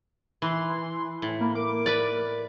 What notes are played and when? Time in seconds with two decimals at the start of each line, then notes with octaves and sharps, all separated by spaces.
0.42 E3 C6
1.22 A2
1.41 A#3 B5
1.55 A#4 D6
1.86 B4 D5